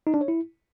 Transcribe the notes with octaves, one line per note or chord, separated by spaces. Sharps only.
D#4
D4
C#5
E4